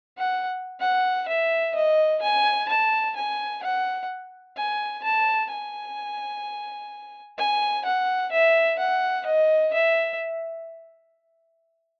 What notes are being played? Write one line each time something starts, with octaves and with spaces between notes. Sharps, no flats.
F#5
F#5
E5
D#5
G#5
A5
G#5
F#5
G#5
A5
G#5
G#5
F#5
E5
F#5
D#5
E5